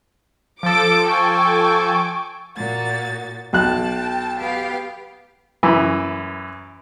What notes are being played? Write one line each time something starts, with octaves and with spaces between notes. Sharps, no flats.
F3 A4 D6 D7
G5 G#5 C#6 D6
A#2 F#4 A6
B1 G5 A5 F#6
B3 G4 F5
F#2 E3